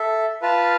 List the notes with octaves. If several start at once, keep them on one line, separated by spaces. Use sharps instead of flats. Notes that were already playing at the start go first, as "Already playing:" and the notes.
Already playing: A4 E5
F4 B4 F5 A5